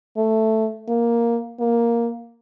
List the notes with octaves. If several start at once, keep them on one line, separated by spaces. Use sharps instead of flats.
A3
A#3
A#3